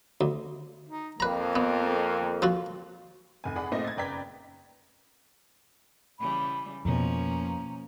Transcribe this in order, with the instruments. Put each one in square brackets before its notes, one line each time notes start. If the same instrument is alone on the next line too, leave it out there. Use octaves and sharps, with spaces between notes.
[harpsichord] D2
[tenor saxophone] D#4
[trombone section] F2 [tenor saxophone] A#3 [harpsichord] B4 A#5
[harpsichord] B3
F3 F4 F#4
[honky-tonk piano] F1 G#5
G#4 D5 F#5 B5
A#2 A3 C4 D#4 D#5 A#6
G#6 A6
F#1 B4 D5 G5 A#5 B6
[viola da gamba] C#3 E3 G3 [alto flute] B5
[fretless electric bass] F2 B2 [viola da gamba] F3 A#3 C#4 [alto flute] A#5